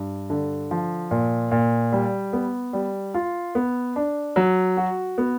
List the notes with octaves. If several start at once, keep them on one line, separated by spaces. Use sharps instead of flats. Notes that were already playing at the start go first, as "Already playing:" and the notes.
Already playing: G2
D3
F3
A#2
A#2
G3
B3
G3
F4
B3
D4
F#3
F#4
B3